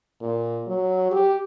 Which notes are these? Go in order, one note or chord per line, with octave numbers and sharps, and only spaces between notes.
A#2
F#3
G4